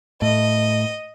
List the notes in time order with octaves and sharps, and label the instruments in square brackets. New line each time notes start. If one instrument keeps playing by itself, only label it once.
[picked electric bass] A2 [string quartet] D#5